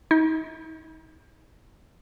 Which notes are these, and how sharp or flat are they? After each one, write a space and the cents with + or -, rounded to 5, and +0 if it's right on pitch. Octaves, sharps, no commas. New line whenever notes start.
D#4 +45